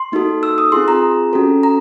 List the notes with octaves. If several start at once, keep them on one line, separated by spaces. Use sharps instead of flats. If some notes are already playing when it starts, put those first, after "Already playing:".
Already playing: C6
A#3 D#4 F#4 A4
E6
D#6
C4 F4 G#4 C6
A#5
C#4 F#4 A4
A#5